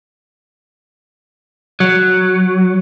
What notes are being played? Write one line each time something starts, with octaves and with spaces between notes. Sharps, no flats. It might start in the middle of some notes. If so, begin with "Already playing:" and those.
F#3